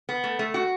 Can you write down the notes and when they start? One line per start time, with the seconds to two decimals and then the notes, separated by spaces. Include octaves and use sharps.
0.09 B3
0.24 A3
0.39 A3
0.54 F#4